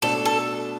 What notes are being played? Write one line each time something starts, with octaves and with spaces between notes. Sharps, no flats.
B2 A3 D4 A4
A4